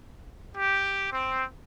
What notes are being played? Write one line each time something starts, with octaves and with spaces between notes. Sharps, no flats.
G4
C4